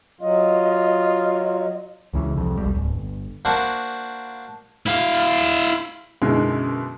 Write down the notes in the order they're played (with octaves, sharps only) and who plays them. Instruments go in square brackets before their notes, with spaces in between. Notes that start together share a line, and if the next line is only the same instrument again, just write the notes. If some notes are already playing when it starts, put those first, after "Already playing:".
[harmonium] F#3 [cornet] F4 [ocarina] D#5
[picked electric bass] C#2 C#3 E3
C2 F2
E1 B1 G3
D1
G1
[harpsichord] A#3 D4 F#4 C5
[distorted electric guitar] E4 F5
[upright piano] F#2 B2 D3 G#3 D#4 E4